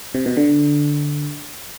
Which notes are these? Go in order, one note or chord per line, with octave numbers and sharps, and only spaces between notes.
C3
B2
D3